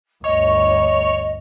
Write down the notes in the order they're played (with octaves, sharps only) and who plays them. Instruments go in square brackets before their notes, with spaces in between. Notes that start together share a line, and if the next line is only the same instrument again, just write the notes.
[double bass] G1 D2 [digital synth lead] C#5 [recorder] D#5